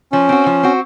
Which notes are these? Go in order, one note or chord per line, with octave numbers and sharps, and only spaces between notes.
F3 C#4
C4 F#4
F3
C4 F#4